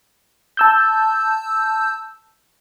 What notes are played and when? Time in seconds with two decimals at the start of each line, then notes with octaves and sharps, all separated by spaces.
0.57 A5 E6 G6